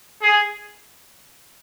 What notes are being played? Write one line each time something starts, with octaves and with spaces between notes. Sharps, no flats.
G#4